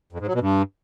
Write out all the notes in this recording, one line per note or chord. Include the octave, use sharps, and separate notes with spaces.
F2
G#2
F#3
B2
G2